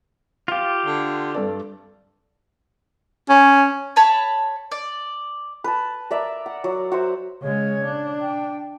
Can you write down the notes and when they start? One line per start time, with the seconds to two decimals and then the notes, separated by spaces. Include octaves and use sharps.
0.48 F4 G4 F5
0.86 D3
1.34 G2 A4 D5
3.29 C#4
3.96 C#5 A5 B5
4.71 D5
5.64 B4 A5
6.11 A#4 D5 E5
6.46 F#5
6.64 F#3
6.92 F#4 C5 E5
7.42 C#3 G#3 C#5
7.84 D4
8.21 G5